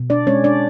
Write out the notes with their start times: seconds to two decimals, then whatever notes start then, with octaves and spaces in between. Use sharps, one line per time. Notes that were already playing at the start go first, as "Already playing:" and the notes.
Already playing: B2
0.10 D4 D5
0.27 G#3 C#4 C#5
0.44 D4 D5